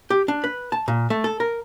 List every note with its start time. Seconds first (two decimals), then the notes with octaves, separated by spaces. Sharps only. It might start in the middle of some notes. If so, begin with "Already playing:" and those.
0.10 G4
0.28 D4
0.44 B4
0.72 A5
0.88 A#2
1.10 A3
1.24 A4
1.40 A#4